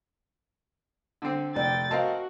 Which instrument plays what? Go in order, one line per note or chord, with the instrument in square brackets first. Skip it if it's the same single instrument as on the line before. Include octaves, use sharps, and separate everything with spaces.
[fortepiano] D3 C4
[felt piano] F1 D5 [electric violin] G5 A6
[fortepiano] C4 A#4 F5 [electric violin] F#4 [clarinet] D#5 [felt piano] A5